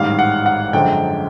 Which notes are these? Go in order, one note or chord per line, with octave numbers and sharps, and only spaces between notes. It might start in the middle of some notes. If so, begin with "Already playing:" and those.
Already playing: A1 G#2 D#3 G3 F5
F#5
F#5
F#2 D3 F3 G#3 G5